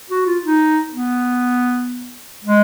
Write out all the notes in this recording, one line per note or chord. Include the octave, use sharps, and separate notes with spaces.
F#4
F4
D#4
B3
G#3